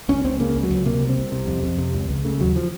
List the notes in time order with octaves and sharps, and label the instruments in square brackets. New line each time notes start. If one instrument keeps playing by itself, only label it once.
[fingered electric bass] C#2 C#4
C#2 C4
C#3 A#3
C#2
F#3
C#2
C3 A#3
C2
C4
C2
C3
F2
F2
C3
C#2
C#2
C#3 A3
D#2 F#3
F3